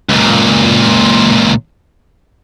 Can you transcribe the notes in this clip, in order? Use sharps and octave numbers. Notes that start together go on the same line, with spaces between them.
C#2 A#2